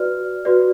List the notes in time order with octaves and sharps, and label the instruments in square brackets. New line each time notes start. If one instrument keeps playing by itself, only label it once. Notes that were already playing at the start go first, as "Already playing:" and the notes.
Already playing: [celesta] F#4 B4 D5 F6
F#4 B4 D5